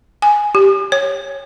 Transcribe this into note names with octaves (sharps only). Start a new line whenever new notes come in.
G#5
G4
C#5